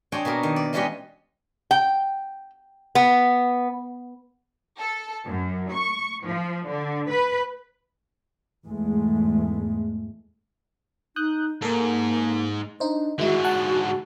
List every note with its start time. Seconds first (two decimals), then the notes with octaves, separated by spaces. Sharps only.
0.12 C4 D4 C#5 D#5 G5 G#5
0.25 B2 A#3 A#4
0.43 D#3
0.56 D5
0.73 E3 G3 G#3 C#4 G4 D#5
1.71 G5
2.95 B3
4.80 A4
5.26 F#2
5.72 C#6
6.26 F3
6.67 D3
7.10 B4
8.66 E2 G#2 G#3 A3
11.16 D#4 D#6 F#6 G6
11.62 G#2 A#3 A4 A#4
12.80 D4 D#4 C5
13.18 G#2 D3 D#3 G#3 E4 F#4
13.45 F#5 A5 F#6